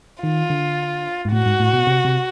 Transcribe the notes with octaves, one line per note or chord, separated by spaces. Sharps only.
D#3 F4
D3
G#2
A2 F#4
G#2
A2
B2
C3
C3